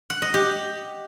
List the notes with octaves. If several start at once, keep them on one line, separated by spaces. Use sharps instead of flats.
F#5
D#5
G4